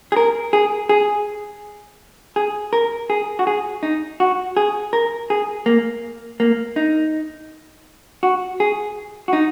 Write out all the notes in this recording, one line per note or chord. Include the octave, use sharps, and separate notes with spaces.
G#4
A#4
G#4
G#4
G#4
A#4
G#4
F#4
G#4
D#4
F#4
G#4
A#4
G#4
A#3
A#3
D#4
F#4
G#4
F#4
D#4